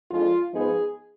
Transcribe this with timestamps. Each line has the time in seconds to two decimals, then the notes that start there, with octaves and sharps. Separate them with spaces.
0.11 F2 F3 G#3 D4 F4
0.53 G#2 F3 B3 D#4 G#4